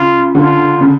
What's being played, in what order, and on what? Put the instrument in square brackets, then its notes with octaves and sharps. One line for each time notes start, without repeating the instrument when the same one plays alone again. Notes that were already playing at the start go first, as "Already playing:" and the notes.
Already playing: [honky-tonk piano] C#3 [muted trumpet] F4
[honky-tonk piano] D3 [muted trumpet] F4
[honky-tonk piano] C#3